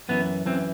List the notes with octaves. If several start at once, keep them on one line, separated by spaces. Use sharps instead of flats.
F#2 E3 B3
F#2 E3 C4